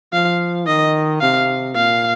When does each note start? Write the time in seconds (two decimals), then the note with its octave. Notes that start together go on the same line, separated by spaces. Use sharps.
0.13 F3 F5
0.67 D#3 D#5
1.21 C3 F5
1.75 A#2 F5